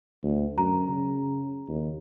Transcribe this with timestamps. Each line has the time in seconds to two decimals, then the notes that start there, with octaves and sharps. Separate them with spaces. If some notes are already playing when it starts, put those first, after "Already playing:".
0.23 D2
0.58 F#2 A#5
0.89 C#3
1.68 D#2